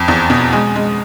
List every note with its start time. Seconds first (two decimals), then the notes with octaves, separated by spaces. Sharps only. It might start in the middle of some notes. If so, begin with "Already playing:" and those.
Already playing: F2
0.08 E2
0.30 B2
0.53 G#3 G#5
0.75 G#3